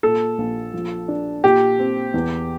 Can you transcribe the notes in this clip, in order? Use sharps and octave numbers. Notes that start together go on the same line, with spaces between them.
A#2 A4
A#1
F3
D4
A#2 G4
C4
E2